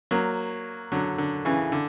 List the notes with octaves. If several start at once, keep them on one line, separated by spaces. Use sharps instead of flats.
F#3 A#3
D3 F#3
D3
C#3 E3
D3